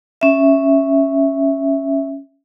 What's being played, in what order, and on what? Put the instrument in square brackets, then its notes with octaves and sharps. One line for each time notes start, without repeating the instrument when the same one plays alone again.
[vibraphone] C#4 E5